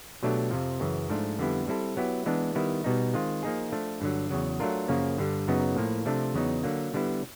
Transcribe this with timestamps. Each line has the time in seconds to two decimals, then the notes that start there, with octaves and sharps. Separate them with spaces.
0.23 B2 F#3 A3 D4 G4
0.51 F2 C3 F3
0.80 F#2 C#3 E3
1.10 G#2 F3 A3 D4
1.39 F2 D3 G3 B3 E4
1.68 G3 C4 E4 A4
1.97 F#3 B3 E4 G4
2.26 E3 G#3 B3 D4
2.55 D#3 G3 B3 E4
2.84 B2 G3 B3 D#4
3.14 D#3 G#3 C4 F4
3.43 F3 A#3 D#4 G#4
3.72 F3 A3 D4
4.01 G2 D3 F#3
4.31 E2 C#3 F#3
4.60 F#3 A3 D4 F4 A#4
4.88 F#2 C#3 F3 A#3 C#4
5.18 G2 D3 G3
5.48 F#2 C#3 F#3 B3 D#4
5.76 A2 F3 A#3
6.06 C3 F3 A3 D4
6.34 E2 C#3 F#3 B3 D#4
6.63 D3 F#3 A#3
6.94 D3 G3 B3 E4